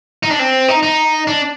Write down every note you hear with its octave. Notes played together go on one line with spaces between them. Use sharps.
D#4
D4
C4
D#4
D#4
D4